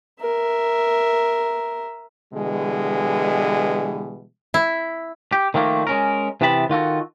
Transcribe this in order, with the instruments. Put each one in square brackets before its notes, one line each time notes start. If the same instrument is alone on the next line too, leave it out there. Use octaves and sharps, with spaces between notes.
[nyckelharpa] A#4 E5
[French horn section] B2 D3 E3 G3 G#3
[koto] E4
[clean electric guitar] G4
D#3 F3 A3 A#3
G#3 C#4 A#4
C3 E3 B3 C4 A5 B5
D#3 F4 F#4 A4